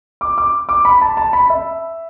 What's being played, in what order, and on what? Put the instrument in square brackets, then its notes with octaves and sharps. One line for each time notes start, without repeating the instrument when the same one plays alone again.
[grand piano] D6
D6
D6
B5
A5
A5
B5
E5